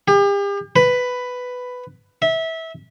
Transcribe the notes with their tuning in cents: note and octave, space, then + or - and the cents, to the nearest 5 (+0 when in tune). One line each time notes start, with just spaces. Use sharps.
G4 +40
B4 +10
E5 -20